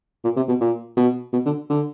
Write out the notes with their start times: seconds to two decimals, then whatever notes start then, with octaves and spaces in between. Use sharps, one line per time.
0.24 A#2
0.36 C3
0.48 B2
0.60 A#2
0.96 B2
1.33 B2
1.45 D3
1.69 D3